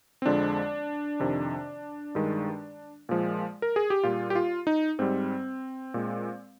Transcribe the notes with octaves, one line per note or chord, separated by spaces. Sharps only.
C4
F2 D3 F3 G#3 D4
F2 C3 D#3
G2 D#3 G#3
A#2 F3 G#3
A#4
G#4
G4
A#2 G3 F4
G4
F4
D#4
G#2 G3 C4
A#2 G#3